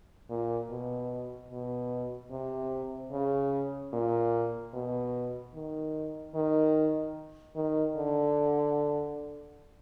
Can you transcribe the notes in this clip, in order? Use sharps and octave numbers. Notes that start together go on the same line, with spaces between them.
A#2
B2
B2
C3
C#3
A#2
B2
D#3
D#3
D#3
D3